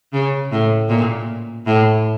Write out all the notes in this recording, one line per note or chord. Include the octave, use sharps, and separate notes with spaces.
C#3
A2
A#2
A2